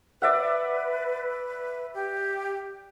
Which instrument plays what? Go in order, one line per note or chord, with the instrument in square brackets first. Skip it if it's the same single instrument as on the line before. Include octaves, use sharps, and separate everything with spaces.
[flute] B4 [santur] D5 E5 F#5
[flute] G4